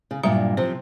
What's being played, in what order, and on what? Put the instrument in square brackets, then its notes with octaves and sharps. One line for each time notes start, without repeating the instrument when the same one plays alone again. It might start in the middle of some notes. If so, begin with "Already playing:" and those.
[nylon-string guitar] C#3
[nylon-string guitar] G2 A#2 [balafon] F#3 E5 A#5
[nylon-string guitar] C3 F3 C4 [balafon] C5